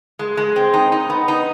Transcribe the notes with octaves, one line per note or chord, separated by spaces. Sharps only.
G#3
G#3
C4
D#4
D#4
B3
D#4